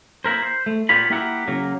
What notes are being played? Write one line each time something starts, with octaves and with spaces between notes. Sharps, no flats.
A#3 E4 A#4 C5
C5
A3
A#2 B3 F4 G4 C#5 B5
A#3 E4 G4 A#4 E5 F#5
C#3 F#3 A#3